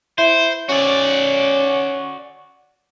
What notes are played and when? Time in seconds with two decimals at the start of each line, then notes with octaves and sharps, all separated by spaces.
0.18 E4 C5
0.69 C#4 F#4 D5